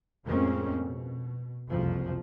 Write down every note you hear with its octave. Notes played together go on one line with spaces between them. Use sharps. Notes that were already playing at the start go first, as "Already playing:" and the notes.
F2 A2 G#3 A#3 C4 C#4
B2
F#1 C2 F2 F3